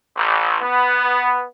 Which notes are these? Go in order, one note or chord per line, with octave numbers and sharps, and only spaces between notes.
A1
B3